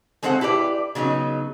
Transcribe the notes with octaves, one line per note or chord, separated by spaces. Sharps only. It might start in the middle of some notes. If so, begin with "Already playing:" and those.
G#3 C4 A4 C5 C#5 F#5
E4 G4 B4 D5
C#3 F#3 B3 D#4